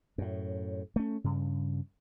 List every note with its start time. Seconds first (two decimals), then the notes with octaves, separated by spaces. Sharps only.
0.18 F#2 A2
0.96 A3 C#4
1.24 G2 C#3